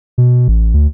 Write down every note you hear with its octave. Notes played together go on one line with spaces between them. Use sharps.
B2
A1
D2